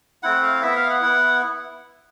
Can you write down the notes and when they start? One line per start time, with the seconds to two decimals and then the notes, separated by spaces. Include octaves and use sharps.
0.23 A3 C4 E4 F#5
0.43 F5
0.62 B3 E4 E5
0.76 F5
0.89 F#5
1.03 B3 E4